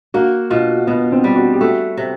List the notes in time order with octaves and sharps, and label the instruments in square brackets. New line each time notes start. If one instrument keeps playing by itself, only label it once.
[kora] A#3 [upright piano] F#4
[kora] B2 [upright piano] F4
[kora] B2 [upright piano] B3
[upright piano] C4
[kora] G3
[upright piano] F#4
G4
[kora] A3 [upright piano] F#4
[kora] C3